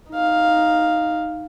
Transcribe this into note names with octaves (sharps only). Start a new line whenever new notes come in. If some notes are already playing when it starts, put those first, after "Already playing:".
D#4 F5